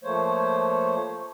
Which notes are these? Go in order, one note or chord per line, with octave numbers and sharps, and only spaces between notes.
F3 A3 A#3 C5 C#5